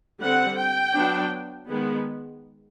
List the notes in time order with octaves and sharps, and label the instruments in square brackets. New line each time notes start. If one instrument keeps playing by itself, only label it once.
[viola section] D3 G3 C4 F#5
G5
F#3 B3 D4
D#3 G#3 B3